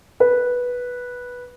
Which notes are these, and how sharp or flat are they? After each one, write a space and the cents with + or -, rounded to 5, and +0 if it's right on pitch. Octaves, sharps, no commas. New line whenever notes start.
B4 -10